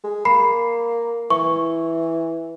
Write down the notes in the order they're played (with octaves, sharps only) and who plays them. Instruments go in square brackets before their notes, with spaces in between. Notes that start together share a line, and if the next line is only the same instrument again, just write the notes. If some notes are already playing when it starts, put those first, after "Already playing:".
[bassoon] G#3
[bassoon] A#3 [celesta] B5 C7
[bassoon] E3 [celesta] C#6